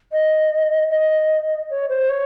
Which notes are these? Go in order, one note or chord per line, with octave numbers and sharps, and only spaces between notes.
D#5
D#5
C#5
C5
C#5